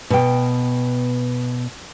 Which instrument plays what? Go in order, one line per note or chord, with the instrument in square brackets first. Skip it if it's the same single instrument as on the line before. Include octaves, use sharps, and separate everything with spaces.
[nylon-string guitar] B2 G5